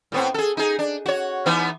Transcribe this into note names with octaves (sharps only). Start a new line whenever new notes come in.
A2 B3 C4
G#4 A4
D#4 G#4
D4
F#4 C#5
E3 B3 D#4